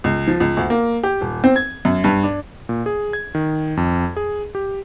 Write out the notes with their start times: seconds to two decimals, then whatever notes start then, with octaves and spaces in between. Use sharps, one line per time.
0.04 C#2
0.27 F3
0.40 C#2
0.57 D2
0.70 A#3
1.03 G4
1.21 D#1
1.44 C4
1.56 G#6
1.85 F#2
2.04 G2
2.24 D4
2.69 A#2
2.86 G#4
3.13 G#6
3.35 D#3
3.77 F2
4.17 G#4
4.55 G4